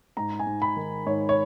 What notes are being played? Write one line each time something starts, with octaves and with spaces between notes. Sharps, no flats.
G#2 A#5
G#5
G#2
B5
D#3
G#2 C#5
C#5